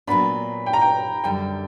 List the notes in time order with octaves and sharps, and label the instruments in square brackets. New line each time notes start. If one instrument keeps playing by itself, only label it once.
[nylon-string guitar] A#2 F#3 B3 D4 [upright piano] B5
[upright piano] G5
A#5
G5
[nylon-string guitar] F#2 D3 G3 [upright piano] G5